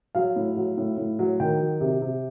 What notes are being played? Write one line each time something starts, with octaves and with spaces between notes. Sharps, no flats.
F#3 F5
A2
F#3
A2
A2
F#3
D#3 G5
F#3
C3
C3